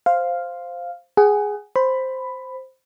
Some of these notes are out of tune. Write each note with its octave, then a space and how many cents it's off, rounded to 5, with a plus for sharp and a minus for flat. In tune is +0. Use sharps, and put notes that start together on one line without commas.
C5 +0 F5 +0
G#4 +0 F#5 +35
C5 +0 B5 +10